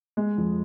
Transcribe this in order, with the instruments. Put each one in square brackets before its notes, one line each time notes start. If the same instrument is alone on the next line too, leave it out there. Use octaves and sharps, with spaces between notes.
[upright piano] G#3
F2